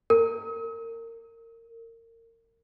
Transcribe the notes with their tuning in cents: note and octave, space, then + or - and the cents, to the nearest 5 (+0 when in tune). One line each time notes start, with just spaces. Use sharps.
A#4 -25